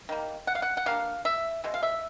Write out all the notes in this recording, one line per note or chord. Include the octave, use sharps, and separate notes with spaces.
D#3 G3 A#3
F#5
F5
F#5
F#5
G3 A#3 D4 F5
E5
B2 G#3
F5
E5